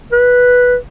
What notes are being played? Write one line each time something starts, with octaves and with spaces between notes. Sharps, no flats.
B4